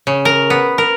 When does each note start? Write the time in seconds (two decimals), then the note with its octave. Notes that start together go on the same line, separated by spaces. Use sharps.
0.07 C#3
0.25 A#4
0.50 B3
0.78 A#4